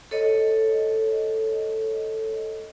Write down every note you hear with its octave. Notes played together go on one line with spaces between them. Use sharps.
A4 C#5 D#5